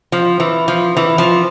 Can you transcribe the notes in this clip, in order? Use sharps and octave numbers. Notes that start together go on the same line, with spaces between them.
F3
E3
F3
E3
F3